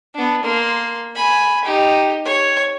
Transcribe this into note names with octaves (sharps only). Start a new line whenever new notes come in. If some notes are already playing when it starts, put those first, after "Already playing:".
B3 D4
A#3 C6
G#5 B5
D#4 G4
C#5